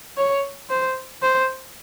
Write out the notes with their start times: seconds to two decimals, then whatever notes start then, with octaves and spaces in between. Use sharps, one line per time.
0.17 C#5
0.70 C5
1.22 C5